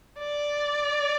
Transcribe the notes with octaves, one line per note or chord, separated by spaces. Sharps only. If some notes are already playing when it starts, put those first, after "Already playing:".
D5